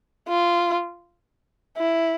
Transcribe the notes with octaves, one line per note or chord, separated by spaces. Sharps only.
F4
E4